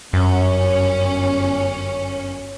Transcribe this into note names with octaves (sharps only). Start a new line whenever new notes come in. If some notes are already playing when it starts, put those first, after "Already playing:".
G1 F#2 C#4